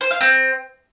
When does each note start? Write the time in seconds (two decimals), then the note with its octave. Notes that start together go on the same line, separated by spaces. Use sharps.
0.01 C5
0.11 F5
0.21 C4